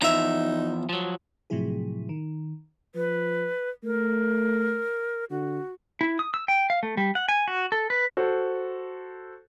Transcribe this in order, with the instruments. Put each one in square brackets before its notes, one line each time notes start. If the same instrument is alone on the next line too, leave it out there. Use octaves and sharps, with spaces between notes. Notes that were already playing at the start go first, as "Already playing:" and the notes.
[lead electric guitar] E2 F3 [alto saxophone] D#4 [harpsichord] E5 A#5
[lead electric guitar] F3 F#3
[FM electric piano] A2 C3 F3 F#3 E4 G#4
D#3
[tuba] F3 [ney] B4
[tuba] A3 [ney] A#4
[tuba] D3 [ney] F#4
[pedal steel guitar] E4
D#6
E6
G5
F5
A3
G3
F#5
G#5
F#4
A4
B4
[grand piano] F#4 A4 C5